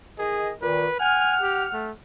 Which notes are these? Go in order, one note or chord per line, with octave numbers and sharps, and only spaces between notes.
D#3 G#4 D#5
A#2 D#3 B4
F#5 G#5 F6
G4
A3